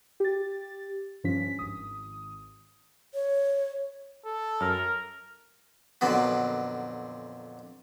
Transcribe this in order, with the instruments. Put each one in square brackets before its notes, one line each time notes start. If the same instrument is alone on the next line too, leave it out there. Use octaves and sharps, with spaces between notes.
[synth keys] G4 A6
G2 F3 C#4 B6
G#1 D#6
[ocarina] C#5
[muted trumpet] A4
[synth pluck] F#2 [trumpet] A#4
[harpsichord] F2 A#2 D3 F#3 B3 F#4